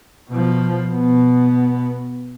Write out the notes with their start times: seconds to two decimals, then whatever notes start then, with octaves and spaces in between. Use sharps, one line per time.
0.30 B2 F3
0.93 B2 B3